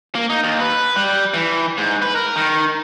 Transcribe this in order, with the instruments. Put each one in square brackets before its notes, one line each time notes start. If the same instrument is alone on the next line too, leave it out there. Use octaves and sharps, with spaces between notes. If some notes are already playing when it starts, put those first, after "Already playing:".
[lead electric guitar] A#3
D#4
D#2
B4
G3
E3
G#2
B4
A#4
D#3